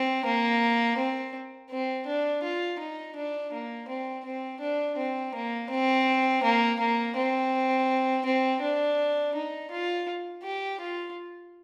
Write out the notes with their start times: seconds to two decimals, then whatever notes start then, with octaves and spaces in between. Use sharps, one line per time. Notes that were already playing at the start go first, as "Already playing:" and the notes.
Already playing: C4
0.25 A#3
0.97 C4
1.70 C4
2.07 D4
2.43 F4
2.79 D#4
3.16 D4
3.53 A#3
3.88 C4
4.25 C4
4.61 D4
4.97 C4
5.35 A#3
5.70 C4
6.44 A#3
6.80 A#3
7.16 C4
8.25 C4
8.62 D4
9.35 D#4
9.71 F4
10.43 G4
10.80 F4